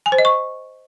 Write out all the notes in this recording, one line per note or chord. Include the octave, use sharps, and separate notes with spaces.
G#5
C5
D#5
C#6